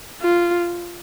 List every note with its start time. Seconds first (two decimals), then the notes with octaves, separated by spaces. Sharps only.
0.22 F4